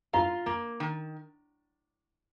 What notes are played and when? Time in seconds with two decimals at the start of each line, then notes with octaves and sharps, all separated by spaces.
0.13 F4 A#5
0.46 A#3
0.80 D#3